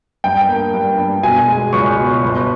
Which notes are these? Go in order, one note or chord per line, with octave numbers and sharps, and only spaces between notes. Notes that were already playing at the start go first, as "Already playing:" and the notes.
G2 G5
A#3
G2
G2
B2 G#5
G#3
C#2 C#6
B2
G1